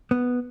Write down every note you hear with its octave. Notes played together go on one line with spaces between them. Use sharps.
B3